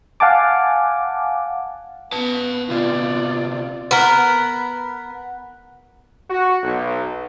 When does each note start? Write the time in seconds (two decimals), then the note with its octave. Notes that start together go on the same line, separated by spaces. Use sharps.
0.20 F5 F#5 G#5 A5 D6
2.12 B3 B4 A5
2.70 C3 B3 F4 D5
3.91 B3 A#4
6.30 F#4
6.63 B1